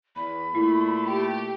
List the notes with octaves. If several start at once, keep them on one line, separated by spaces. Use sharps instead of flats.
E2 B5
A#2 A3 E4
G4